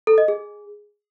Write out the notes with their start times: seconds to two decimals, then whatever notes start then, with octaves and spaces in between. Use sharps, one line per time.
0.07 A4
0.18 D#5
0.28 G#4